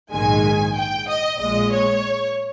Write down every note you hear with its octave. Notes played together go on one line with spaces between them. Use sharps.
A#1 G#2 D#3 G#3 G#5
G5
D#5
A#1 A#2 G#3 D#5
C#5